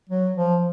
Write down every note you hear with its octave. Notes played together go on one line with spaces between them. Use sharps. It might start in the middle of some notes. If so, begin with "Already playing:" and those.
F#3
F3